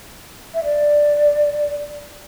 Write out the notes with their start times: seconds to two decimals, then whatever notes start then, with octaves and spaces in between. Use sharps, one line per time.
0.54 E5
0.64 D5